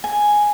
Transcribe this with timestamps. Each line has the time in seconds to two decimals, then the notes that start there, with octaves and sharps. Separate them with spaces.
0.04 G#5